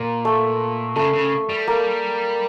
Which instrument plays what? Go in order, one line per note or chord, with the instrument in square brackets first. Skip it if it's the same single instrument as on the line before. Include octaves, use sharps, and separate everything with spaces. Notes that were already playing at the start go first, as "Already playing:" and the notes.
Already playing: [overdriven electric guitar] A#2 [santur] A#3
[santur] A3
[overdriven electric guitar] C#3 [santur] A3
[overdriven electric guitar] C#3
G3
[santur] A#3